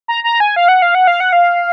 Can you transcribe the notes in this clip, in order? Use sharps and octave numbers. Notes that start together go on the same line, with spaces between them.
A#5
A#5
G#5
F5
F#5
F5
F#5
F5
F#5
F5